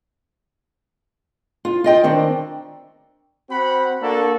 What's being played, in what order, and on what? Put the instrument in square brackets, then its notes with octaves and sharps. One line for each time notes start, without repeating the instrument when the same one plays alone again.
[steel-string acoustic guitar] F4
F4 D#5 G5
D#3 C4 D4
[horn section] C4 F#4 F#5 B5
A#3 D4 F#4 A4